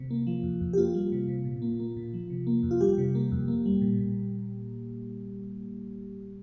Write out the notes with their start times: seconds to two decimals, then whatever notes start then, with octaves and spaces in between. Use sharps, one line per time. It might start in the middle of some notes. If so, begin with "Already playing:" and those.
Already playing: C3
0.11 A#3
0.27 F3
0.43 F2
0.61 F2
0.73 G4
0.77 A#3 F4
0.94 G3
1.12 C3
1.28 C3
1.45 A#2
1.62 A#3
1.80 A#3
1.97 A#2
2.14 F3
2.30 C3
2.47 A#3
2.63 F2
2.71 F4
2.81 G3 G4
2.98 C3
3.15 A#3
3.32 F2
3.48 A#3
3.66 G3
3.81 A#2
3.99 A#2